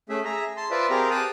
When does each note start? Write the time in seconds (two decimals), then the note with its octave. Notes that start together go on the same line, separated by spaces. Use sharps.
0.09 A3 C#4 G#4 E5
0.25 G#4 E5 A#5
0.57 A5 C6
0.71 F4 B4 C5 D5 E5
0.90 C4 G4 G#4 A#4 F5 A#5
1.10 F5 G5 A5 D#6 F#6